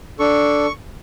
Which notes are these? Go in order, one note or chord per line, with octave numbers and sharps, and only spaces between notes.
D4 A4 C#6